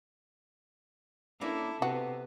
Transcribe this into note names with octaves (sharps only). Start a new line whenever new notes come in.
A#3 C#4 D4 E4 A4
C3 B3 F#4